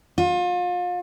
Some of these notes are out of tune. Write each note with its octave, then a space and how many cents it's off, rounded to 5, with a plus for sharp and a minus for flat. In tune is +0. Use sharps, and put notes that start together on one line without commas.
F4 +35